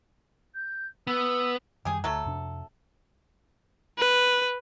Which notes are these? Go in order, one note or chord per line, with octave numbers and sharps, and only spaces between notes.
G6
B3 E6
F#2 D#3 G3 G4 G#4
D2 F#3 A3 A4
F2 C3 D4
B4